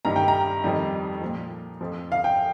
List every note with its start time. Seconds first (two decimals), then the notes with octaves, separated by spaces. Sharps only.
0.05 G2 D#3 G3 A#5
0.16 G5
0.28 A#5
0.64 F2 D#3 G3
1.22 A#2 F3
1.81 F2 F3
2.12 F5
2.24 G5